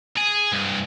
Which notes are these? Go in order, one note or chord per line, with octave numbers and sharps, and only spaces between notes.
G#4
C2 G2